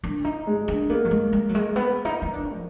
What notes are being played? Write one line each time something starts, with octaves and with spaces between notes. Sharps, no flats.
D4
D#4
G#3
D4
A#3 B3
F#3
G#3
G#3
F#3
G#3
B3
D#4
D#4
D4
F3